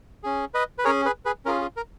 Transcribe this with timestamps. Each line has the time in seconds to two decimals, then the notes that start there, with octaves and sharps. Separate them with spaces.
0.24 C#4 G#4
0.54 B4 D#5
0.78 B4
0.85 C#4 G#4 A#4 C#5
1.05 G#4 B4
1.25 G#4 B4
1.45 C#4 F4 G#4 A#4
1.61 G#4
1.77 A#4